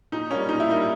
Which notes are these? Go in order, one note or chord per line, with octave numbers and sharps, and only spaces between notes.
A#2 D#4
G3 A#3 C#4
A#2 D#4
E4
G3 A#3 D#4